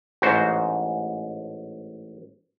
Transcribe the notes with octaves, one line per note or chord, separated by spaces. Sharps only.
A1 G#2 F#4 C5